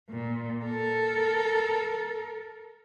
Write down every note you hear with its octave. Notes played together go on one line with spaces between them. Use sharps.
A#2
A4 A#4